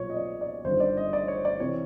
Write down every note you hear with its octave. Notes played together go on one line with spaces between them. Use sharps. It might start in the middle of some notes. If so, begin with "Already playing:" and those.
Already playing: B1 A#2 C#5
D#5
D5
D5
G1 G2 D#3 C5
D5
D#5
D5
C#5
D5
C3 E3 C#5